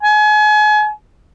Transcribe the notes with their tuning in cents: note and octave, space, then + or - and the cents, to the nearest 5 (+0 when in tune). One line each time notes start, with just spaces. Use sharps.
G#5 +35